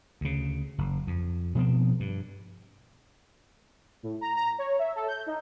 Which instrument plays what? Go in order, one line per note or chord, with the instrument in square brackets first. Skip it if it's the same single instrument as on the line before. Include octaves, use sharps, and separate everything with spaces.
[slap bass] D2 C#3
F#1
F2
B2 F3 B3 C4
G2
[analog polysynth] A2
A#5
A#5
C#5
E5
A4
G6
D#4